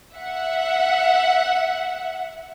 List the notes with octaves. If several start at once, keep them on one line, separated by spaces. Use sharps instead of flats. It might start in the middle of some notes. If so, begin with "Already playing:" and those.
E5 F#5